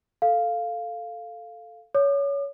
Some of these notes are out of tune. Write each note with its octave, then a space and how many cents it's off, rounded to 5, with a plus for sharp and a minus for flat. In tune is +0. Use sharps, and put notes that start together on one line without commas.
A4 +0 F5 +0
C#5 +20 D6 +45